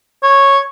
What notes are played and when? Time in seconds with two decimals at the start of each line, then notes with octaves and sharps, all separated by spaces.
0.23 C#5